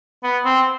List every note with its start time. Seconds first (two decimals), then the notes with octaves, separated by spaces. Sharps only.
0.24 B3
0.45 C4